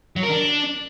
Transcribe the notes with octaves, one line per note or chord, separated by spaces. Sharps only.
F#3
A#4
D4